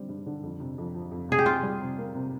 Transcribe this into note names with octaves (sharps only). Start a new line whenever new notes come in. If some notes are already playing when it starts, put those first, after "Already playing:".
Already playing: D3 G3 C4
G2
D3
F2
C3
F2
F3
F2
C3 G#4
G4
C3 F4
G3
C3
A#3
C3